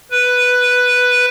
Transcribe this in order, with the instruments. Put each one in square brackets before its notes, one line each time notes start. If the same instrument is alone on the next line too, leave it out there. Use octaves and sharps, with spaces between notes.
[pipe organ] B4